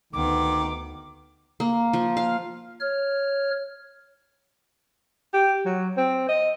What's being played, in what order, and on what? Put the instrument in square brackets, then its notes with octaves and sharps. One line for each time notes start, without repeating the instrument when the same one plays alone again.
[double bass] D2 B3 [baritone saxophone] D#3 [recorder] D6
[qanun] A#3
F3
F5
[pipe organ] C#5 F6
[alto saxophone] G4
F#3
C4
D#5